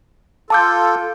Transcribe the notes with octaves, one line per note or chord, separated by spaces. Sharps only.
F4 A4 A5 D6 G6